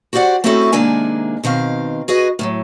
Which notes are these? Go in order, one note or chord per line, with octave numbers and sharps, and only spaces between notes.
F#4 G4 C5 D5 F#5
A3 C4 C#4 E4 F#4 A4
C3 D#3 G#3 A#3 D4 G#5
B2 D#3 C4 F5
F#4 G#4 B4 D#5
A2 F3 F#3